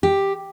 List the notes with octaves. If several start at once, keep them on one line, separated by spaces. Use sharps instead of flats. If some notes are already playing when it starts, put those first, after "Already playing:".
G4